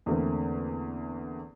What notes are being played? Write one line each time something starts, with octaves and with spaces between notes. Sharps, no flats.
E2 D3 A3 A#3 C4